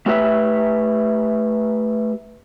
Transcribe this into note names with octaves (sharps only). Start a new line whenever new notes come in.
A3 G4 B4 E5